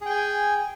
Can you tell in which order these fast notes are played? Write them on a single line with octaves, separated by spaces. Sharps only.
G#4 G5 G#5